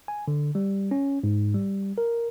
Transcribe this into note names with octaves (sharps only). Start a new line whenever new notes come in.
G#5
D3
G3
C#4
G#2
G3
A#4